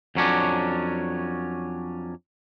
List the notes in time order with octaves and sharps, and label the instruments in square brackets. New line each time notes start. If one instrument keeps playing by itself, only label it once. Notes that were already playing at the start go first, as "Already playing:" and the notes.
[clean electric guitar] F2 F#3 C#4 D4